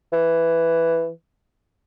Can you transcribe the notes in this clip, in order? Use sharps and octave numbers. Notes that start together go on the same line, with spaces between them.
E3